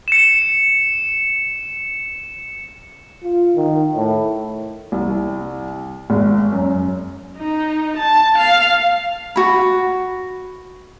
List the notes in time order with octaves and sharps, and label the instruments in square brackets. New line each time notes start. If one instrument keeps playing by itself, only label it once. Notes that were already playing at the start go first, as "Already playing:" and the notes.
[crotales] C#7 E7
[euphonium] F4
D#3
A2
[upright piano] C2
G#1
F#2
[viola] D#4
A5
F5
[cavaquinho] F#4 B5